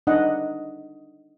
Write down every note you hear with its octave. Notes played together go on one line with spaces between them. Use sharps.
D4 D#4 D#5 F#5